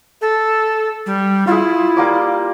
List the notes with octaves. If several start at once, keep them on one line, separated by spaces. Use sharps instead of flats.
A4
G3
E4 F4 G#4
G3 A#3 D6